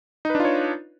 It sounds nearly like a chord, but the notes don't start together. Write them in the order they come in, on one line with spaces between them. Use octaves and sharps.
D#4 B4 D4 F4 C#5